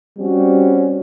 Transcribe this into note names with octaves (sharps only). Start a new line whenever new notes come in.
G3 C4 C#4 F#4